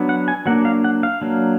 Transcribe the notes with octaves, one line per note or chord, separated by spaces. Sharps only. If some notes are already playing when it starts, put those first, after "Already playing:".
Already playing: F#3 B3 D4
F#5
G#5
F#3 A#3 D4 F#5
F5
F#5
F5
F#3 A#3 D4